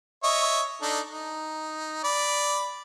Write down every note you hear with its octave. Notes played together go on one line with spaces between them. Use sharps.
C#5 D#5 E5
D4 D#4 A4
D#4
D5 B5